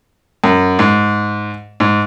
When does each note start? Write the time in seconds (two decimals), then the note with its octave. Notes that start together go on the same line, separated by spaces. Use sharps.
0.44 F#2
0.79 G#2
1.80 G#2